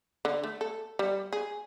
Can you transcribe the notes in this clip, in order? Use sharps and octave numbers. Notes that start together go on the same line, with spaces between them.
D3
A3
A4
G3
G#4